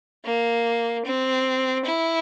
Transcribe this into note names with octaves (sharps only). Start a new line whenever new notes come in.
A#3
C4
E4